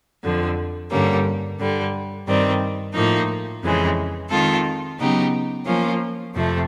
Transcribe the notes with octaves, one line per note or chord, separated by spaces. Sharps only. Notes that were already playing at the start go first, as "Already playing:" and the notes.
F2 D3 F3
G2 D3 G3 A#3 C#4
G2 D3 G3
G2 D#3 G3 C4
A2 F3 A#3 D#4
F2 C#3 E3 G#3
D#3 G#3 C4 F4 A4
C#3 F#3 B3 D#4 G4
F3 A#3 C#4 F4
F2 C3 F3 A3